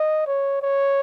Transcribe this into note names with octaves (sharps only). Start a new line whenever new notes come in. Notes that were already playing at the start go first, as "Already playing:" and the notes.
Already playing: D#5
C#5
C#5